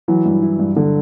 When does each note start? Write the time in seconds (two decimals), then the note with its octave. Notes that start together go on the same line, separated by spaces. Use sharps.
0.08 E3 F#3
0.25 G2
0.42 E4
0.59 G2
0.76 D3